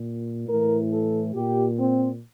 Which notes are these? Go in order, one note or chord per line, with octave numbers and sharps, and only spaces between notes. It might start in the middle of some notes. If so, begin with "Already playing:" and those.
Already playing: A#2
A2 E3 A#4
A4
A#2 G4
C4